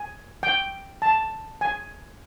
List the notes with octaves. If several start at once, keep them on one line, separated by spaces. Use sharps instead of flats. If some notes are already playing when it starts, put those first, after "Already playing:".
Already playing: G#5
G5
A5
G#5